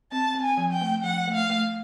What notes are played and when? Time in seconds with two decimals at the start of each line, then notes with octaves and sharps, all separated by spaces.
0.12 C4 A5
0.35 C4
0.42 G#5
0.57 F3
0.73 G5
0.81 A3
1.04 F3 F#5
1.28 A3
1.34 F5
1.50 A3